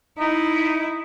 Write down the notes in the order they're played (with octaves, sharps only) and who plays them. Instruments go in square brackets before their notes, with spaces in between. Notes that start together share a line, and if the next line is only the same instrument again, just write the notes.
[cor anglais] D#4 [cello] E4